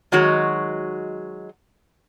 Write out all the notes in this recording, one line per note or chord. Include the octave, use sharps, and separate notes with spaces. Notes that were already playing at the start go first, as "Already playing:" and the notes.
D#3 F#3 G#3 F#4 C#5